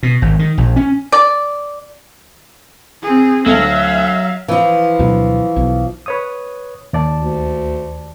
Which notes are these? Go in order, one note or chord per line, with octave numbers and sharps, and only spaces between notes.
B2
G#1
D#3
A#1
C#4
D5
C4 G#4
D2 F#3 A4 E5 F5
E3 F3
D2 B2 F#3
B1
B4 C#5 D#6
D#2 D5 A5
D2